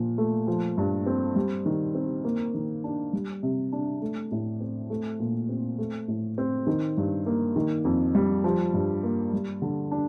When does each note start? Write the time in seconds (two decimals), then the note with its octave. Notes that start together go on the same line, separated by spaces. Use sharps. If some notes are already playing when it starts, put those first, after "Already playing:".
Already playing: A#2 F3
0.18 A3
0.47 F3
0.77 G2
1.06 C4
1.36 G3
1.66 D#3
1.95 C4
2.24 A#3
2.54 D#3
2.84 D4
3.13 G3
3.43 C3
3.72 D4
4.02 A3
4.32 A2
4.61 C4
4.90 A3
5.20 A#2
5.49 C4
5.78 A3
6.08 A2
6.38 C4
6.67 D#3
6.97 G2
7.26 A#3
7.56 D#3
7.85 F2
8.15 G3
8.44 F3
8.74 G2
9.03 A#3
9.33 G3
9.62 D3
9.91 D4